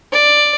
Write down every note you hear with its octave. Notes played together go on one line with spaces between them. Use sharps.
D5